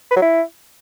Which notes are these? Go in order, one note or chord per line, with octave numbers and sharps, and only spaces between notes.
B4
F#3
E4